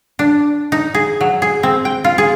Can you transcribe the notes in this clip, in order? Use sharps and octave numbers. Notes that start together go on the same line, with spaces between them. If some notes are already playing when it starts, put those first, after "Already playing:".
D4
D#4
G#4
F#3
G#4
C4
G5
F4
G#4